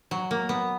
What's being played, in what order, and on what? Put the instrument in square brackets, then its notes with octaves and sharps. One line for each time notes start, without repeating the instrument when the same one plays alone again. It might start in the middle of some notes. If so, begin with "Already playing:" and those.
[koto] F#3
A#3
B3